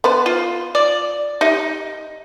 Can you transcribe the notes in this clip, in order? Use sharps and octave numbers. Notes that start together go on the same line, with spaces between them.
B3 B4 C5
F4
D5
D#4 G4 E5